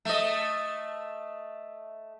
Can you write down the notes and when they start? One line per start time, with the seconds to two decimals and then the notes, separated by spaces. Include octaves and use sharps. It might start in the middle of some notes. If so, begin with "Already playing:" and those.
0.05 A3 D#5